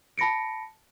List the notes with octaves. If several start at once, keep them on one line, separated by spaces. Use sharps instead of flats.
A5 B5 A#6 C#7 D7